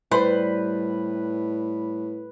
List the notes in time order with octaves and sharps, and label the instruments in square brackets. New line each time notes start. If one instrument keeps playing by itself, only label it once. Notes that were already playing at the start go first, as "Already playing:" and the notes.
[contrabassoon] A2 [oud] G3 [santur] B4 [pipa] C5